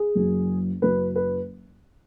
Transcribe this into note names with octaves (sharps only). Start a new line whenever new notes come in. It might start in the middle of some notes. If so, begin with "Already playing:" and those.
Already playing: G#4
F#1 F#2 F#3
F#1 F#2 F#3 B4
B4